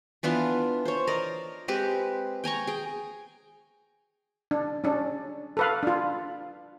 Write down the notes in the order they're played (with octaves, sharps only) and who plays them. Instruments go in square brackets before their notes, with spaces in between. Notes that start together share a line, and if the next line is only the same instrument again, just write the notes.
[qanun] E3 B3 D4 F4
C5 C#5
A#4 D5 D#5
G#3 C4 G4 B4
G5 G#5 A#5 C#6
G#4 G5
[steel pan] D4
C#4 D4
A4 B4 F5
D4 F4